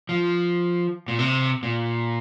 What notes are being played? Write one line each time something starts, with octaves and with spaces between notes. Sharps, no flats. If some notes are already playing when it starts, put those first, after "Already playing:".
F3
A#2
C3
A#2